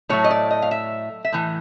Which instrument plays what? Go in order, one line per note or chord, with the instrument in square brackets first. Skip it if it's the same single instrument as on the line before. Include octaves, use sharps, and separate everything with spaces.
[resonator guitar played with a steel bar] A2 F#3 A3 C#5
D#5
D5
D#5
F5
E5
E5
A2 E3